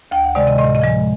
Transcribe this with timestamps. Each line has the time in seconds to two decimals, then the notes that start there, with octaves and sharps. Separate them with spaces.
0.11 D2 G5
0.24 F#5
0.35 C3 D#3 G#3 D5
0.47 D#5
0.58 A2 D#5
0.75 D#5
0.82 F3 G#3